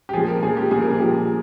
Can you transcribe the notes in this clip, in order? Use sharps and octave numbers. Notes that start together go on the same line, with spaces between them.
G4
A#2 F3 G#4
A#4
A#2 F3 G#4
G4
A#2 F3 G#4
A#4
G#4
A#2 F3 G4